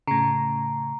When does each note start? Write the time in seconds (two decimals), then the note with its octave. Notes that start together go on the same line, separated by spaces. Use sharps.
0.07 A2 C#3 A#5